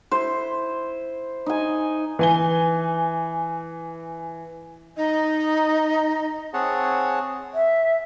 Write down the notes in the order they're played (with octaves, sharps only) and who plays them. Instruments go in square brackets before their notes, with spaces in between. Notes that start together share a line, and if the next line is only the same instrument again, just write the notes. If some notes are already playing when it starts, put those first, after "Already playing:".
[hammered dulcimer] E4 C5
D#4 G#5
[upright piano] E3 G#5 G7
[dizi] D#4 [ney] D#5
[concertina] C4 G#4 C#5 F#5 A5
[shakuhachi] E5